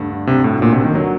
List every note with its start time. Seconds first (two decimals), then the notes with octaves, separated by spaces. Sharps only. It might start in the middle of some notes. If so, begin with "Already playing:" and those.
Already playing: G2 D3 A3
0.11 D3
0.27 G2 C3
0.44 A2 F#3
0.62 G1 A#2
0.73 C3
0.79 A#3
0.84 D#3
0.95 D3 F#3